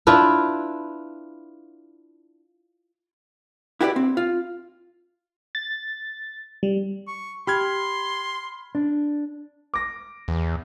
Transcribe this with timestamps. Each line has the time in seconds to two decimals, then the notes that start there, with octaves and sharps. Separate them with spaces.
0.07 D4 E4 F4 B4
3.81 E4 F#4 G4 B4 C5 D5
3.96 C4
4.17 F4
5.55 A6
6.63 G3
7.07 C#6
7.47 G4 B5 C6 F6 G#6
8.75 D4
9.74 D6 A#6
10.28 E2